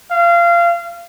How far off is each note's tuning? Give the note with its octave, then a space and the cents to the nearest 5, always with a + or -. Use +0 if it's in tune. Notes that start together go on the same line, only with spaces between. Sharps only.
F5 -25